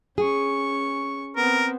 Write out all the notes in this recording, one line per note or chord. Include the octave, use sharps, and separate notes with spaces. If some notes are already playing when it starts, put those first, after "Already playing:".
C#4 G#4 C#6
B3 C4 A#4